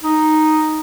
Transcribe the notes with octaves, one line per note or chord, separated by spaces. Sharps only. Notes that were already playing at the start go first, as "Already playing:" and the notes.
D#4